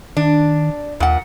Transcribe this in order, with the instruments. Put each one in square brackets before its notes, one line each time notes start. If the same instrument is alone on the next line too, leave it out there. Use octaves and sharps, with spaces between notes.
[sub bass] D#3 [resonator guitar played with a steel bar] D4
[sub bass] D#2 [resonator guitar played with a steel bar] A#2 F#5